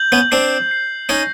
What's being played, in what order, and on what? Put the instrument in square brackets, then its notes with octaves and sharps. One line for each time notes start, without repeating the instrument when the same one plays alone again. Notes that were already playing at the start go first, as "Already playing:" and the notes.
Already playing: [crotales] G6 F#7
[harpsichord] B3 C#4
[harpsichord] C4 D4 [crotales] C7
[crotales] C7
[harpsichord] C#4 D#4 [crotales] A#6